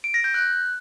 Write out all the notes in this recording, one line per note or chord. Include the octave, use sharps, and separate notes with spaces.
D7
A#6
G6
F#6